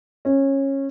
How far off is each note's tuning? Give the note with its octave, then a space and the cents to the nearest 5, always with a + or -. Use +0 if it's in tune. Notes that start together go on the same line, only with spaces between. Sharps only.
C#4 -20